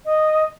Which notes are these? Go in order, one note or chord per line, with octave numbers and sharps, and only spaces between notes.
D#5